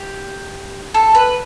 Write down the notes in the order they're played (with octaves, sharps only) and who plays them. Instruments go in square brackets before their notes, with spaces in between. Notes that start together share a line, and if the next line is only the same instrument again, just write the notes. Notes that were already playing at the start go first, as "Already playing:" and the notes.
Already playing: [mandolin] G4
A4
B4